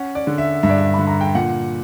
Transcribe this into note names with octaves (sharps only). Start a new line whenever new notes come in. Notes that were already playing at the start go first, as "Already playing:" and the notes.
Already playing: C#4 F#5
D5
D3
E5
G2 E5
D5
E5
D3 B5
A#5
G5
A#2 F#5